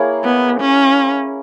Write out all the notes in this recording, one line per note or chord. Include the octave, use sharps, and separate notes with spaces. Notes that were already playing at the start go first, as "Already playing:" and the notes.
Already playing: A#3 E4 G#4 C#5
B3
C#4